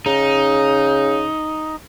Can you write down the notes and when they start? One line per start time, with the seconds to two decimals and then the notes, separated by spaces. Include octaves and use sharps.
0.06 C#3 D#4